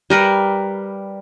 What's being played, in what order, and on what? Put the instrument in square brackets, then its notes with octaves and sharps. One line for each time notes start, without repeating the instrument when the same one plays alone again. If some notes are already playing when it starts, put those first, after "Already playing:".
[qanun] G3 A#4 B4